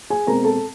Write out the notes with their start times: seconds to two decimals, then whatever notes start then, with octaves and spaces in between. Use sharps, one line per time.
0.10 G#4 G#5
0.27 B2 G#3 C4 A#4 A#5
0.44 A4 A5